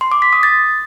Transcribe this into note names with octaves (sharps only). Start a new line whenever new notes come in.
C6
D6
B6
D#6
A6